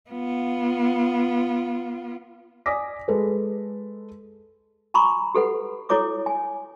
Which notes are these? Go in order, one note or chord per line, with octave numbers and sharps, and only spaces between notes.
B3 F4
D5 G#5 D6 D#6 A#6 B6
G#3 A4 B4
G#5 A#5 B5 C#6 D#6
G4 A4 B4 F#5
E4 A4 C#5 D6 D#6
G#5